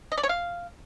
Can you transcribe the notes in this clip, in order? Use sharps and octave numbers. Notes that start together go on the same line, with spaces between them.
D#5
D5
C#5
F5